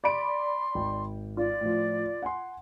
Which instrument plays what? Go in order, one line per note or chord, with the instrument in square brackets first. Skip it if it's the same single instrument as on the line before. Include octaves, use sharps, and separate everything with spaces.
[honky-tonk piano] D5 B5 D7 [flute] C6
[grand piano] G#1 G5
[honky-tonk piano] F4 [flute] D5
[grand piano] A2 F3
F#5 G#5 C6